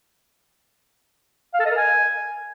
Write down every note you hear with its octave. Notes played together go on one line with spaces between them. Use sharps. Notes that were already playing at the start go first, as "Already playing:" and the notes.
F5
A4
D#5
A#4
G#5